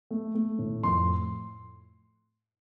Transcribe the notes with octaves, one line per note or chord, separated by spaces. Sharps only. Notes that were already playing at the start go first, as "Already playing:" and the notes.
A3
A3
A2
F2 C6